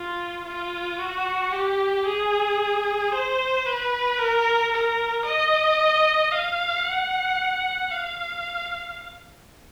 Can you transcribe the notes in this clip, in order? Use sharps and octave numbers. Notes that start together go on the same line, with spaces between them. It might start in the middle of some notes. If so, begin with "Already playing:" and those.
Already playing: F4
F4
F#4
G4
G#4
C5
B4
A#4
A#4
D#5
F5
F#5
F5